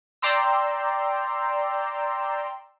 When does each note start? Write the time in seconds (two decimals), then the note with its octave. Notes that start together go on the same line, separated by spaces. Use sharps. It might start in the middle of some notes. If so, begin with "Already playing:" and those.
0.22 D5 G5 A#5 C6 E6